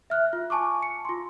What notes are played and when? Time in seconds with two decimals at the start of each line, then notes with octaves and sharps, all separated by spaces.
0.10 E5 F6 F#6
0.33 F4
0.50 G#5 A5 C#6 D6
0.83 C#7
1.05 F4 C6